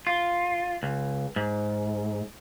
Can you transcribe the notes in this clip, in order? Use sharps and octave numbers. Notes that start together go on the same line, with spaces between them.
F4
C#2
G#2